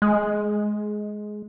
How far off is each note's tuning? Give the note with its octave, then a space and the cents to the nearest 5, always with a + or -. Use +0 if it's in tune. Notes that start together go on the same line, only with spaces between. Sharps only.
G#3 +15